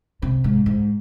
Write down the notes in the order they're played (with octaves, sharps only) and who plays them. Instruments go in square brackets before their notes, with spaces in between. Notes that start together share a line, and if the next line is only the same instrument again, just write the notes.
[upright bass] C3
G#2
G#2